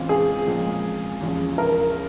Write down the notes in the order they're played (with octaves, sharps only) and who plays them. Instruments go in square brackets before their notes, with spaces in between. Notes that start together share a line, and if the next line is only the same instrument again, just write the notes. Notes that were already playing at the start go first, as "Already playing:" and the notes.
Already playing: [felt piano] C#3 E3 G#3 C4 F4
[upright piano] G#4
[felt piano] A#2 F3 G#3 C4
E2 C#3 F3
[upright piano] A#4